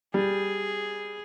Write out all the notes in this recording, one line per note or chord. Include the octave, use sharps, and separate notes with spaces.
G3 G#4